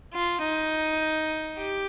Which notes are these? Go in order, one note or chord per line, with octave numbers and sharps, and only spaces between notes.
F4
D#4
G4